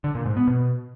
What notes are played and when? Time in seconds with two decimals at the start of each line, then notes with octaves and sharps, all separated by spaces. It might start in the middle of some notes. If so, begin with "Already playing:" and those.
0.04 D3
0.15 A#2
0.26 G#2
0.37 B3
0.47 B2